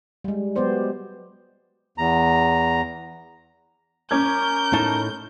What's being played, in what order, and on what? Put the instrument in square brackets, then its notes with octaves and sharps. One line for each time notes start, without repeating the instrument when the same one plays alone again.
[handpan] G3 G#3
F#3 G#3 B3 G4 C5 D5
[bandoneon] E2 A#5
[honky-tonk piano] C#4 D6 G#6 [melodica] A#4 [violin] G6
[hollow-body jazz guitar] A2 D#4 A5